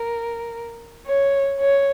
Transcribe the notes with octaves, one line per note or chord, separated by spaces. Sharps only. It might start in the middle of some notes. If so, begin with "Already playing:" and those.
Already playing: A#4
C#5
C#5